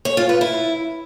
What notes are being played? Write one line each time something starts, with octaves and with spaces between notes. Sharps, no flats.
C#5
F4
B4
E4